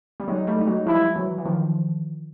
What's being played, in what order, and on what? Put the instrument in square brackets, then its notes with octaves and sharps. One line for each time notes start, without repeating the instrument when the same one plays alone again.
[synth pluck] G3
[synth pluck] F#3 G#3 [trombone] D#4
[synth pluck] G3 A3
[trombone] D#4
[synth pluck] F#3 G#3
[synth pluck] F3 G3 [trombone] E4
[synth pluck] E3 F#3
E3
D#3 F3